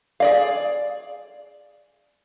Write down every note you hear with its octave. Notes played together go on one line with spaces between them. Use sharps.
G#4 D5 F5